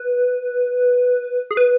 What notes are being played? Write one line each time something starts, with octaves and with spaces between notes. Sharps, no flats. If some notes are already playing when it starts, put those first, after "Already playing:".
Already playing: B4
G#4
B4